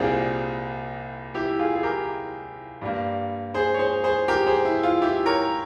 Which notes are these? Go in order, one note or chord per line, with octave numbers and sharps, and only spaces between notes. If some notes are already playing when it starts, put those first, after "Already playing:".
Already playing: C2 A#2 G3 C4 F4 G#4
E4 G4
F4 G#4
G#4
G4 A#4
G2 G3 A#3
G#4 C5
C#5
G#4 C5
G#4 C5
G4 A#4
G#4 C5
E4
F4
E4 G4
A#4 C#5